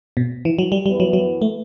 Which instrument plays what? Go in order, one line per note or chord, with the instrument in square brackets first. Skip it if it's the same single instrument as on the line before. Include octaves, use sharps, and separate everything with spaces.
[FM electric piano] B2
E3
F#3
G3
[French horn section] F#2 E3 B3 E4 B4 [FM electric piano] G3
[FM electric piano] F#3
F#3
A3